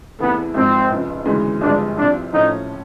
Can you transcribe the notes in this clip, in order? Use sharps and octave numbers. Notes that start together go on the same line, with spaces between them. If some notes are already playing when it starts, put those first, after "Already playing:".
E2 C3 E3 A3 B3
G#1 G#2 F3 C4
F1 F2 C#3
D2 C#3 E3 G#3 B3
G#1 G2 D3 F3 G#3 D4
C2 C3 F3 D4
A2 F3 A3 C#4 D#4